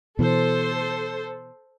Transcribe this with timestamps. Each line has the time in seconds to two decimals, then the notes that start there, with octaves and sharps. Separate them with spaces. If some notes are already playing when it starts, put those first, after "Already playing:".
0.19 B2 E3 A4 C5